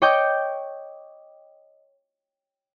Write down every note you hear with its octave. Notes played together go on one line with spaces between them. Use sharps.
C#5 D#5 G5 D6 G6